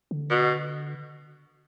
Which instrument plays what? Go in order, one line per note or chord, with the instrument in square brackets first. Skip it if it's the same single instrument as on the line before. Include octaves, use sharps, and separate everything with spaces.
[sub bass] D3
[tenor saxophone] B2